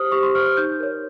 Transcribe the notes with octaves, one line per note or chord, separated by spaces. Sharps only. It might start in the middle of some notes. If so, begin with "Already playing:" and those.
Already playing: G4 C5 D#6 F6
G4 C#6
C6
C5 F6
F6
D#4 G6
A#4 C#5